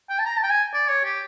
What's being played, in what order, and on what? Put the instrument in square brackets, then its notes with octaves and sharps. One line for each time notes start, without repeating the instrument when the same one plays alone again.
[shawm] G5
A5
A#5
A5
G5
G#5
D5
C#5
G4